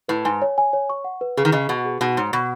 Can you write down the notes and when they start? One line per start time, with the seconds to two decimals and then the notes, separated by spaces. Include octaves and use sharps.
0.09 A2 B4
0.25 G#2 G#5
0.42 C#5
0.58 G#5
0.73 C#5
0.90 C#6
1.04 F#5
1.21 B4
1.37 C#3 G#4
1.45 D#3
1.52 C#3 D#5
1.69 B2 F#5
1.85 G#4
2.01 B2 D#4
2.17 G#2 C#5
2.33 B2 B5